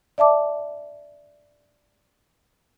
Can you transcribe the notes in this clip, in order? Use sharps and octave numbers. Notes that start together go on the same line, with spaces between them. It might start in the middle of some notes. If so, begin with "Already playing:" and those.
D5 E5 A5 D6